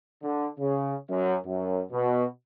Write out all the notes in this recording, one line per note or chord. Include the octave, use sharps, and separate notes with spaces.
D3
C#3
F#2
F#2
B2